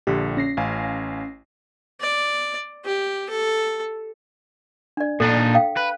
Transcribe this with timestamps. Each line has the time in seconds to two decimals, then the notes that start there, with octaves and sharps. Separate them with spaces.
0.07 A#1 D3 G4
0.37 C#4 A#6 C7
0.57 A1 F5 G#5
2.01 D5
2.85 G4
3.30 A4
4.97 D4 D5
5.20 A#2 D4 D#4 A4
5.55 F5 G5
5.77 B4